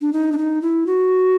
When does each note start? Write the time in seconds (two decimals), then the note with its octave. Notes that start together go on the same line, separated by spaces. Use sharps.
0.01 D4
0.13 D#4
0.32 D4
0.38 D#4
0.62 E4
0.86 F#4